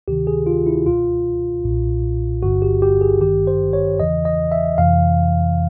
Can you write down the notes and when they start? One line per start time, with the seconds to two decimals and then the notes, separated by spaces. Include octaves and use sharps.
0.08 D2 C3 D#3 G4
0.27 G#4
0.46 F4
0.66 E4
0.86 C#2 B2 F4
1.64 B1 A#2
2.43 G1 G2 D3 F#4
2.62 G4
2.82 G4
3.01 G#4
3.21 G#1 G2 D#3 G4
3.47 C5
3.73 C#5
3.99 E2 C#3 E3 D#5
4.25 D#5
4.52 E5
4.78 F2 C3 E3 F5